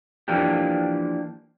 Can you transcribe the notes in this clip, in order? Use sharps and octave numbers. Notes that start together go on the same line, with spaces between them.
E3 F3 A#3 D4 G4